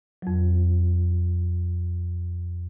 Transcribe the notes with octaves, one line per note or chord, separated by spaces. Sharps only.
F2 F#3